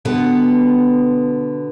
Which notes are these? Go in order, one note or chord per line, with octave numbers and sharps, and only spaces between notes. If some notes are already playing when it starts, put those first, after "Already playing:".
B2 D3 B3 B4 F#5